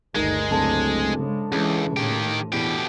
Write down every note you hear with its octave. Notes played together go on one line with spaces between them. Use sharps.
G1 D2 D#3 G#3 A#4
D1 C#2 D4 A4 C5
C#3 G#3
C#2 C#3 E3 G#3
A2 D#3 G4
E2 B2 G4